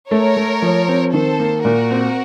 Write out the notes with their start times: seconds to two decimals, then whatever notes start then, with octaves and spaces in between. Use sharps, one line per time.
0.11 A3 A#4 C#5
0.37 A3
0.62 F3
0.88 C4
1.13 D#3 A4 C5
1.40 A#3
1.65 A#2 F#4 A#4
1.91 C4